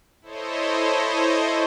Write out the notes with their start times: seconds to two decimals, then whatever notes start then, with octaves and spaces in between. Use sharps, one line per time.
0.22 E4 A4 C5 C#5 D#5